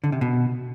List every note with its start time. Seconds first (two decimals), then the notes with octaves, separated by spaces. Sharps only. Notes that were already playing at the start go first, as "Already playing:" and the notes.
0.04 D3
0.12 C3
0.21 B2